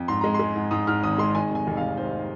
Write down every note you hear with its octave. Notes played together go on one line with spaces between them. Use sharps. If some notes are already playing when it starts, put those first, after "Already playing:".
Already playing: F2
G#2 C6
G#3 A#5
C6
G#3
G#2
G#2 D#6
G#2 F6
G#1 D#6
G#3 C6
D#3 G#5
F1 G#5
F1
F5
F1
D#2 C5